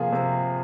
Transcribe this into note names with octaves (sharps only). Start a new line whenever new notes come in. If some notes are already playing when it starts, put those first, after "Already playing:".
Already playing: C3 F3 A#3 F4 G#4
C3